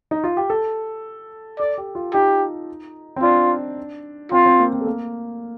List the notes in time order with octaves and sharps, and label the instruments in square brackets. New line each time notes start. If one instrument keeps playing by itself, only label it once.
[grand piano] D#4
F4
G4
A4
[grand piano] A4 [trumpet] D5
[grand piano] G4
F4
[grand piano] D#4 [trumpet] G4
[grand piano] C4
[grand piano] D4 [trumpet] F4
[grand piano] C4 [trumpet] F4
[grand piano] C4
A#3
C4
A3
A#3